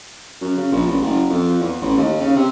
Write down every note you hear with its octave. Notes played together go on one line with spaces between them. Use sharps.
F#2
C#3
A#1
A1
F#1
F2
E2
A1
D#2
C#3
C3